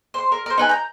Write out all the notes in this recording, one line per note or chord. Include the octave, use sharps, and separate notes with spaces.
C5 C6
A#4
A#4 C5
D#4 B4 G#5
A#5 G6